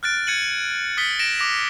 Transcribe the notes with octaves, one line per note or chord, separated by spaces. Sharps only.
F6 F#6 A6 D7
G#6 C#7 D#7 F#7
D#6 A6 B6 C#7 G7
A#6 D7 E7
D6 A#6